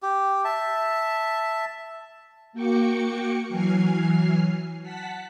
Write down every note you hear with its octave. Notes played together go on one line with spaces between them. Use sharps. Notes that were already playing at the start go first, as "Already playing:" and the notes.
G4
E5 A5
A#3 F#4 G5 C#6 D6 C#7
E3 F#3 G#5 F6 C7
F#5 A5 B6